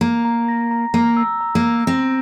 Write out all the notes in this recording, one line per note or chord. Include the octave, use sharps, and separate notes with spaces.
A#3 A#5
A#5
A#6
A#5
A#3 A#5
E6
A#5
A#3
E6
C4 A#6